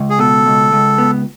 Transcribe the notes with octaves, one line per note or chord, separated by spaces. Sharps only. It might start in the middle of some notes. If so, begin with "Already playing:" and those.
Already playing: C#2
G#4
B2 A4
C#2
C#2
B3